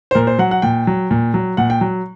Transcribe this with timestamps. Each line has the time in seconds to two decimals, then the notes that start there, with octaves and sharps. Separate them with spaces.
0.11 C5
0.15 A#2 A#4
0.27 C5
0.39 F#3 F#5
0.51 F#5
0.62 A#2 G5
0.87 F#3
1.11 A#2
1.34 F#3
1.57 A#2 F#5
1.70 G5
1.81 F#3